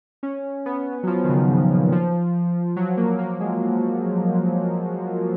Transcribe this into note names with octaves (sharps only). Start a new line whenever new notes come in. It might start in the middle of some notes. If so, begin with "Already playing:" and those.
C#4
B3
F#3
F3
D#3
C#3
G#2
A#2
F3
F#3
A#3
A#3
G#3